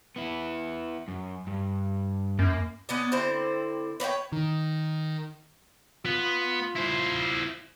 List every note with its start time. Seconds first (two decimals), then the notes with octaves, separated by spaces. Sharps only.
0.16 B3 E4
1.08 F#2
1.47 G2
2.39 F#2 A#3
2.89 B3 C#4 D4
3.12 D3 C4 E4 C5
4.00 B4 C#5 F#5 G5
4.32 D#3
6.06 B3 F4
6.76 E4 C5